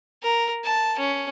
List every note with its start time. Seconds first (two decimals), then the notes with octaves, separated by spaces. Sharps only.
0.23 A#4
0.64 A5
0.98 C#4